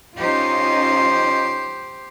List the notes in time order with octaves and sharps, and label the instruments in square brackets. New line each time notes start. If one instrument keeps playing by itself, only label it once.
[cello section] C#4 D#4 F4 [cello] G4 C5